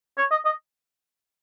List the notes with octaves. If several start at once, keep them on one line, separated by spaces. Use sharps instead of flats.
C#5
D#5
D#5